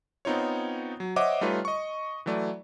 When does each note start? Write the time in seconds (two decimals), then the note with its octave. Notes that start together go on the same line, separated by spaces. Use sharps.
0.25 B3 C4 D#4 F4 C#5
1.00 F#3
1.16 C5 C#5 D#5 E5 F#5 D6
1.41 G3 A3 D#4 F4 B4 C#5
1.65 D#5 C#6
2.26 E3 F#3 A3 D5